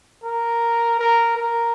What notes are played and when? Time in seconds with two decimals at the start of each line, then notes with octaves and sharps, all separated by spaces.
0.23 A#4
0.99 A#4
1.37 A#4